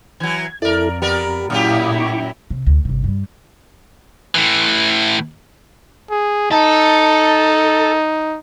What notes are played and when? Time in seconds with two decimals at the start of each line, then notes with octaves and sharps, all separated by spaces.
0.20 E3 F#3 G#6
0.62 F2 E4 A4 A#4 D5
1.02 B3 G4 A#4 D5
1.50 F#2 A#2 F#3 E4 G4 F5 D6 D#6
2.00 C#6 D6
2.50 C3
2.66 D2
2.85 G1 C3
3.04 G2 G3
4.35 A2 E3
6.10 G#4
6.52 D#4 A4